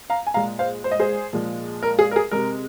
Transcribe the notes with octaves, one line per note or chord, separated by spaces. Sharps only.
F5 A#5
G#5
A#2 G#3 F5 A#5
C5 F5
C5
D#5
G#4 C5
A#2 F3 G#3
A#4
G#4
A#4
G#4
C3 G#3 A#4